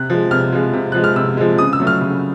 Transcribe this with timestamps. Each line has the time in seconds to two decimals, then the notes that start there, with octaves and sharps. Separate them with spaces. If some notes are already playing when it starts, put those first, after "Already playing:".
Already playing: C3 F#6
0.10 F3 G#3
0.31 C3 F6
0.52 F3 G#3
0.73 C3
0.92 F3 G#3 F#6
1.04 F6
1.16 C3 E6
1.37 F3 G#3
1.58 C#3 D#6
1.73 E6
1.80 F#3 A3
1.87 F6
2.01 C#3